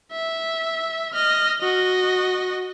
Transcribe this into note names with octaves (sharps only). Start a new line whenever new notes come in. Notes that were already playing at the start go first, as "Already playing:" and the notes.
E5
D#5 F6
F#4 D#5